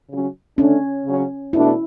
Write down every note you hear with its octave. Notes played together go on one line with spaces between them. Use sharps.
C#3 F#3 C#4
D3 A3 C#4 D4
C#3 F#3 C#4
B2 A3 D4 E4